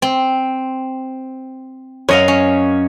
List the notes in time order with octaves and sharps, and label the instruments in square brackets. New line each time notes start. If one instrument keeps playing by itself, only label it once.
[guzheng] C4
[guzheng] F#2 D#5 F5 [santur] C#5
[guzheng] C#4